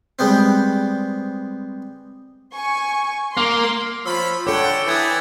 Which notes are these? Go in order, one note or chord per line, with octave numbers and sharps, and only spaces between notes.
G3 G#3 B3 C4
G#5 C#6
A#3 C6
F3 C#4 B5 E6
D3 C#4 A4 C#5 F#5 G5 D6 C#7
E3 E4 G4 D#6 G#6 A6